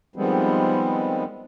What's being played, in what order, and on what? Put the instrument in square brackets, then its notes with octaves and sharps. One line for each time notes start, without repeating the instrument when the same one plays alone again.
[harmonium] D#3 F3 G3 G#3 B3 C4